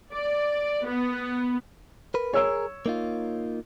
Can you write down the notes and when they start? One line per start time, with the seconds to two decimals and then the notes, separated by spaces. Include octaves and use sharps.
0.13 D5
0.86 B3
2.14 A#4 B4
2.34 G#4 A#4 C#5 E6
2.86 A#3 D#4 F4